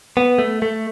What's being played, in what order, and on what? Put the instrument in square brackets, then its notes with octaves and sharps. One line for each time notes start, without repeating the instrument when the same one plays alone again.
[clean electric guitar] B3
A3
A3